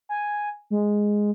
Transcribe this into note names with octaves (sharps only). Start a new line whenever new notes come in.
G#5
G#3